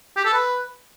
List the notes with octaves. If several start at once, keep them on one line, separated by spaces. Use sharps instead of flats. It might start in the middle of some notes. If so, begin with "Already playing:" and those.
G4
A4
B4